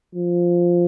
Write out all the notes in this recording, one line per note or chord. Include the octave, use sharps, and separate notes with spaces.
F3